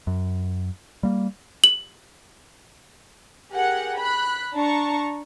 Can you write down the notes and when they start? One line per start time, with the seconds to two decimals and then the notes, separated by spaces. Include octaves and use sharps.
0.07 F#2
1.03 G3 A#3
1.64 F#7
3.51 G4 G#4 A#4 F#5
3.98 B5 F#6
4.54 D4 A5 A#5 C#6